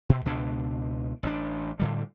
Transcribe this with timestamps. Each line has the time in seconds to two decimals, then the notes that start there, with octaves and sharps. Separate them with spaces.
0.09 B2
0.25 C#2 B2 D4
1.23 A1 C4 D4
1.80 A2 D3 G3